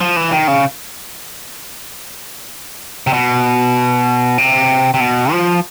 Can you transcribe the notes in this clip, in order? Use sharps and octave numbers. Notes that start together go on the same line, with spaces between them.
F3
E3
D#3
C#3
C3
B2
C3
C3
B2
F3